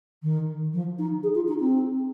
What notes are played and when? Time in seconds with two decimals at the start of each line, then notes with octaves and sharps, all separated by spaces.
0.23 D#3
0.73 F3
0.98 D#4
1.23 G#4
1.34 F4
1.48 D#4
1.60 C4